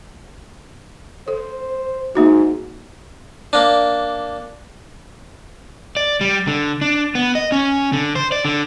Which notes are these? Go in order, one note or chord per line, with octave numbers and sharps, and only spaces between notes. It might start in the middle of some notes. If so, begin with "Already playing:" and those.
A4 C5
G#2 A#3 D#4 F#4
A#3 D4
D5
G3
D3
D4
B3
D#5
C#4
D3
C5
D5
D3